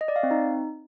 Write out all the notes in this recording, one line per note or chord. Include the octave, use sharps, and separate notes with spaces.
D#5
D5
F5
C4
D#4